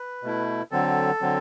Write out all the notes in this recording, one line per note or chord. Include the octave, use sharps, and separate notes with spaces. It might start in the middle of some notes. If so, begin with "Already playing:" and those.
Already playing: B4
B2 A3 E4
D3 F#3 C4 A4
D3 F#3 C4